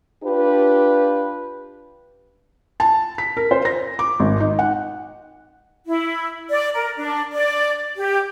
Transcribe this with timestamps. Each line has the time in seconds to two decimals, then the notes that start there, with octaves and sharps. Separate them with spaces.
0.24 D4 F4 G4 B4
2.80 A5
3.18 B6
3.37 A#4
3.51 C5
3.65 A#6
3.99 D6
4.20 G#1
4.40 D#4
4.59 F#5
5.87 E4
6.50 D5
6.74 A#4
6.98 D4
7.32 D5
7.96 G4